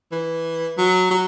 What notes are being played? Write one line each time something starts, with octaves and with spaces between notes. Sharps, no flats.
E3
F#3
F#3